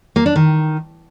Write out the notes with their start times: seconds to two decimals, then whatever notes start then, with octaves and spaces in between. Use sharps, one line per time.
0.16 A#3
0.26 D4
0.36 D#3